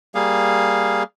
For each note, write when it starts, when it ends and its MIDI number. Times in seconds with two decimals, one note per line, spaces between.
0.15 1.03 55
0.15 1.03 58
0.15 1.03 68
0.15 1.03 77